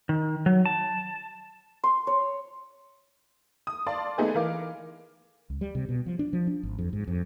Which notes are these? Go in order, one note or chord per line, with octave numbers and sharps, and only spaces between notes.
D#3
F#3
A5
C6
C#5
D#6
D5 F5 A5 C6
A3 B3 D#4 G#4 B4
E3 A#4 F5 D6
C#2
G3
C3
B2
F3
D4
F3
D4
G#1
F2
G#2
F2